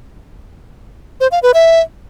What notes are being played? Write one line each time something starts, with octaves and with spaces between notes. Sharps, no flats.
C5
F5
B4
E5